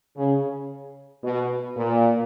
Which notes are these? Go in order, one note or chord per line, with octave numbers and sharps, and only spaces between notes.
C#3
B2
A#2